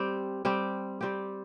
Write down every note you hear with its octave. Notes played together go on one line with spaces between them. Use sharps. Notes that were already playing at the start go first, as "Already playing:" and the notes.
Already playing: G3 C4 G4
G3 C4 G4
G3 C4 G4